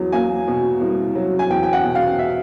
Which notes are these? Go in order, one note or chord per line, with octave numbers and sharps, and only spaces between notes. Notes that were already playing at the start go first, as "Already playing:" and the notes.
Already playing: E2 F#3
A#3 G#5
B2
C2
F#3
G#5
E2 G5
G5
F#5
B2
F5
E5